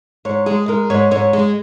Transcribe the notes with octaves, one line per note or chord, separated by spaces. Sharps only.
G#2 C#5
G#3 G#4
G#3 A#4
G#2 C#5
G#2 C#5
G#3 G#4